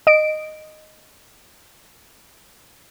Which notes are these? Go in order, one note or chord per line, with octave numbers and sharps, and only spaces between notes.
D#5 D7